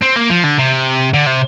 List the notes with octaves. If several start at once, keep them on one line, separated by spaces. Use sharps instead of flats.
C4
A#3
F3
D3
C3
D3
C3